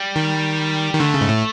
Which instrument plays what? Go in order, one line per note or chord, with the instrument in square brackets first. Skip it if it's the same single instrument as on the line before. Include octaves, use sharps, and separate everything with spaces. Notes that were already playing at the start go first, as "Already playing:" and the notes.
Already playing: [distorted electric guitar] G3
[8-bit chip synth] D#3
D#3
[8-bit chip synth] D3 [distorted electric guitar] A3
[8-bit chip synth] C#3
G#2
A2